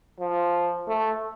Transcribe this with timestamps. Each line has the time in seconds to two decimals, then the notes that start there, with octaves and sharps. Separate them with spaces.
0.20 F3
0.88 A3